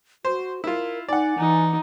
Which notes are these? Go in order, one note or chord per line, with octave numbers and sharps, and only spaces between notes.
F#4 C5
E4 F4 A#4
D#4 D5 F#5 G#5
E3 D#4